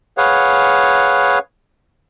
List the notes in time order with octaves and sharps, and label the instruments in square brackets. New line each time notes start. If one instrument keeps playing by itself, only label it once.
[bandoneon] G#4 B4 C#5 F5 F#5